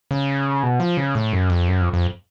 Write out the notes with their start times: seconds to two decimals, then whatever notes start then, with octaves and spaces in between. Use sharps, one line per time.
0.11 C#3
0.63 B2
0.80 F3
0.97 C#3
1.15 A2
1.33 F#2
1.50 F2
1.68 F#2
1.81 F2
1.93 F2